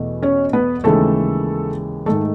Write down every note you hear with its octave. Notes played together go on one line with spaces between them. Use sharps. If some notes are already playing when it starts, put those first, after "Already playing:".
Already playing: E2 B2 A3
C#4 C#5
B3 B4
D#2 C#3 E3 G#3 A3 A4
G#2 D#3 A3 A4